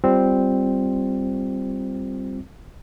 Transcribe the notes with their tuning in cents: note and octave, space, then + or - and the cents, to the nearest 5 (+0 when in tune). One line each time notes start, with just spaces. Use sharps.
G3 +0 C4 +0 F4 +0